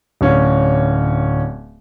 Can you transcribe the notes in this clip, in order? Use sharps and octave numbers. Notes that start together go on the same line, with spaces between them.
D1 C#4